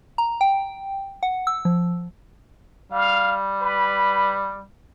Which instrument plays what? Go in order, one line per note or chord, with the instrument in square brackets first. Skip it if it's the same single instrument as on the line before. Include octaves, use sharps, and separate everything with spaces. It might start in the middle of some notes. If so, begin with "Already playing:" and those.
[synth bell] A#5
G5
F#5
E6
F3
[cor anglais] G3 [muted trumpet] F5
[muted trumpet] B4